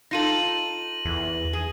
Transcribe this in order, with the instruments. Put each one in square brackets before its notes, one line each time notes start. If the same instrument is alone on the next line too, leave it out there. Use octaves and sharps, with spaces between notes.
[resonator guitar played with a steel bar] D#4 F4 A4 [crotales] A#6 D#7 F#7
[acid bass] E2
[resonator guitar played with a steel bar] G#4